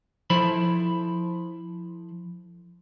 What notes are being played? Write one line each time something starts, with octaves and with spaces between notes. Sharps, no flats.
F3 E4 A4 C5 B5